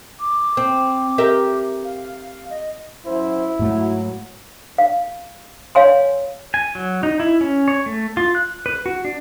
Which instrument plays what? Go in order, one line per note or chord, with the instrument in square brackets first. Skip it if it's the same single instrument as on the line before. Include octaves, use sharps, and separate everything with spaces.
[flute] D6
[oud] C4
G4 A#4 E5
[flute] F5
D#5
[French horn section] F#2 F#3 C5 [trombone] E4
[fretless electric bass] G#2 A3 [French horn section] F#3 A#3 F#4
[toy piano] F5
C#5 F5 G#5 C6
[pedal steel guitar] G#5
F#3
D#4
E4
C#4
C#5
A3
F4
F#6
B4
F#4
D4